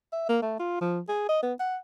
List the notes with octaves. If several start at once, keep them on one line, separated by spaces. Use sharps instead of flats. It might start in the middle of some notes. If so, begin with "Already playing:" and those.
E5
A#3
A3
F4
F3
G#4
D#5
B3
F#5